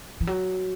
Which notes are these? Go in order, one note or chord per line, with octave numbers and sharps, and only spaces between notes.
E3
F#3